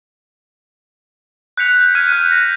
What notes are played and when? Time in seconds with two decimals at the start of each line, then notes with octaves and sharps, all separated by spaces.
1.57 F#6 G6 B6 C#7 F7
1.95 F6 G6 G#6 B6 D#7
2.11 F6 F#6
2.32 A#6